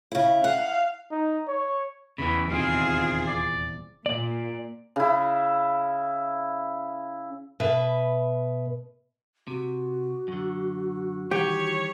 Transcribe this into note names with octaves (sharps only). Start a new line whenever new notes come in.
C#3 E4
F5 F#5
D#4
C#5
E2 C#3 E3 B5
D#1 E2 C3 D#3 C4 F4 G#4 F5
D5
A#2 D5
C#3 E4
B2 B4 E5
C3 F#4
F#2 D3
D#3 E3 G3 G4 C#5